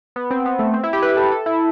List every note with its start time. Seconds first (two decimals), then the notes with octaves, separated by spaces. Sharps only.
0.16 B3
0.31 C4
0.46 B3
0.59 A3
0.74 C4
0.83 E4
0.93 G4
1.02 B4
1.17 A4
1.31 A4
1.46 E4